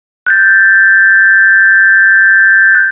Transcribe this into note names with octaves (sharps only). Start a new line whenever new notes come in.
F#6 G6 A6